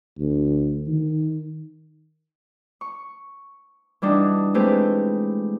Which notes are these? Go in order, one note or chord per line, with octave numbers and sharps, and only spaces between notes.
D2
D#3
C#6
E3 G3 D4 D#4 F#4
G#3 A3 C4 G4 G#4 B4